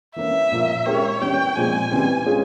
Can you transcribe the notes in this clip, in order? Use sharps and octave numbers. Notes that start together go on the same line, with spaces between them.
E3 A#3 C#4 E5
A#2 F3 A#3 F4
G#3 C#4 G4 A#4 C#5
E3 G3 C#4 G5
A#2 F3 G#3 C4 G#5
C#3 E3 G3 C4
G#3 C#4 F4 G#4